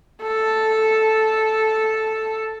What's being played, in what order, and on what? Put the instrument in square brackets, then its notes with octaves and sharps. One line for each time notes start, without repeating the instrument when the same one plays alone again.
[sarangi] A4